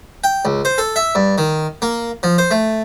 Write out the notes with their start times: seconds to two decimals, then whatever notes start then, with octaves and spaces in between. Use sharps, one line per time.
0.24 G5
0.45 C#2
0.65 C5
0.78 A4
0.96 E5
1.15 G2
1.38 D#3
1.82 A#3
2.23 F3
2.38 C5
2.51 A3